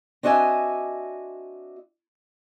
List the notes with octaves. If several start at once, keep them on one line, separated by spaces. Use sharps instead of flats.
C4 D4 F#4 D#5 E5 G#5